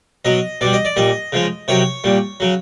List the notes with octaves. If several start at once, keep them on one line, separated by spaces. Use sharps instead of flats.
B2 F#3 D#5
B2 G3 D5
D#5
D5
A#2 G3 D#5
C#3 F3 G#3
C3 D#3 F#3 C#5
A#2 G3
C#3 F#3